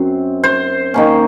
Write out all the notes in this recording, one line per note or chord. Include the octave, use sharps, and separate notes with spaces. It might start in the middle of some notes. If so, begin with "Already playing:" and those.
Already playing: F#2 C4
C5
D#3 A#3 C#4